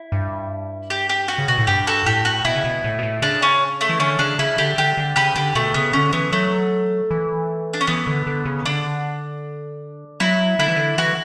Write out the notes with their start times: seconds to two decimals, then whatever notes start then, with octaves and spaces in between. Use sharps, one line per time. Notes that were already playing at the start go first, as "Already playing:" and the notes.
Already playing: E4
0.12 G2
0.90 G4
1.09 G4
1.28 F#4
1.38 C#3
1.48 B2 F#4
1.58 A2
1.67 G2 G4
1.87 F#4 A4
2.06 A2 G4
2.25 F#4
2.45 B2 E4
2.55 C#3
2.64 B2
2.84 A2
2.99 B2
3.03 A2
3.22 C#3 D4
3.42 C#4
3.81 A3
3.89 E3
3.99 D3 C#4
4.19 C#3 D4
4.39 C#3 E4
4.58 D3 G4
4.78 D3 G4
4.97 D3
5.16 C#3 G4 B4
5.36 D3 G4
5.55 B2 A3
5.74 C#3 B3
5.93 D3 C#4
6.13 E3 B3
6.32 F#3 A3
7.11 E3
7.73 D4
7.81 C#4
7.87 E3 B3
8.07 D3
8.27 D3
8.45 C#3
8.65 D3 D4
10.20 F#3 E4
10.59 D3 E4
10.68 E3
10.76 D3
10.98 E3 F#4